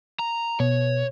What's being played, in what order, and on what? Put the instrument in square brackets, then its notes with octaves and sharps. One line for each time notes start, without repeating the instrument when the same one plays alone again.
[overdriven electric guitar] A#5
[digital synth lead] B2 [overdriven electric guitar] C#5